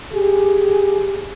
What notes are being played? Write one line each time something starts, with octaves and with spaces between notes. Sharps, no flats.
G4 G#4